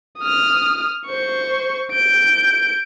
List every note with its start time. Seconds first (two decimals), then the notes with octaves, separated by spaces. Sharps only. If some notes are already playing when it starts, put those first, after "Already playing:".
0.19 D#6 F6
1.07 C5 C#6
1.92 G6 D7